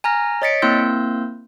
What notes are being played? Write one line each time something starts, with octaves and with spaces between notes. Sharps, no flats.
G#5 A#5 F6 A#6
C#5 D#5 A6 B6 C#7 D7
A#3 C4 E4 C6 E6 G6